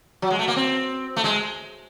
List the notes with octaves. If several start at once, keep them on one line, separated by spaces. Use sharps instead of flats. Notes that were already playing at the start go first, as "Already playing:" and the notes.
F#3
G#3
A3
A#3
C4
A3
G#3